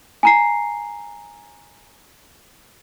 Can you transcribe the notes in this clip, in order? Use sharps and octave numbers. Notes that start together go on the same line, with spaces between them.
G#5 A#5 C7